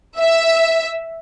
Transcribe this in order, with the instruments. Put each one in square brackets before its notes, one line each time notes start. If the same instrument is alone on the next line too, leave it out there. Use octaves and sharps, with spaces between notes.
[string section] E5